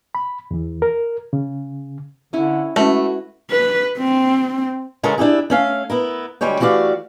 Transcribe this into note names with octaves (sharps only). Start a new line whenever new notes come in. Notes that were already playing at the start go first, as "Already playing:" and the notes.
B5
E2 E3
A#4
C#3
D3 C#4 E4
G#3 A3 C#4 E4 F#4 B4
B4
C4
C#3 G#3 C#4 A4 A#4
D4 E4 G4 G#4
A3 C#4 F5
B3 E4 A#4
D2 G3 G#3 C#5 G5
E3 A3 F#4 G4 D5 F5